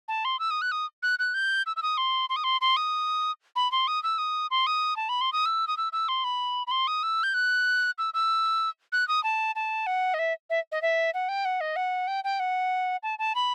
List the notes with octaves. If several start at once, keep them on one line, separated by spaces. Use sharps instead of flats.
A5
C6
E6
D#6
F#6
D#6
F#6
F#6
G6
E6
E6
D#6
C6
C6
D#6
C6
C6
D#6
B5
C6
D#6
E6
D#6
C6
D#6
A5
B5
C6
D#6
E6
D#6
E6
E6
C6
B5
B5
C6
D#6
E6
G6
F#6
E6
E6
F#6
D#6
A5
A5
F#5
D#5
E5
E5
D#5
E5
F#5
G5
F#5
D#5
F#5
G5
G5
F#5
A5
A5
B5